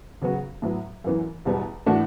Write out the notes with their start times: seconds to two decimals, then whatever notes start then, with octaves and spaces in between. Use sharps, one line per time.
0.21 C#3 F#3 B3 F#4
0.62 A2 F#3 B3
1.04 F#2 E3 B3
1.45 E2 B2 G3 B3
1.86 A2 E3 A3 D4 F#4